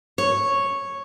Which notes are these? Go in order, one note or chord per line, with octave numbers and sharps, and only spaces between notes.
C#5